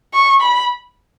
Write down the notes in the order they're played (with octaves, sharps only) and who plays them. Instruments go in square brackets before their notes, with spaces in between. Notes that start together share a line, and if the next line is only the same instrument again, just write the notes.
[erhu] C#6
B5